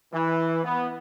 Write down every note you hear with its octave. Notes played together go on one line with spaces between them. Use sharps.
E3
B3